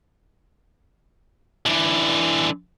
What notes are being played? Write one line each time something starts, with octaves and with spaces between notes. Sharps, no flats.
D3 E3